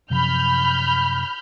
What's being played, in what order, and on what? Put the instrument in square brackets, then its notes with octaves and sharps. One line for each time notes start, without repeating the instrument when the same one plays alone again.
[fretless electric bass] F#2 C3 F3 [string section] B5 F6 G6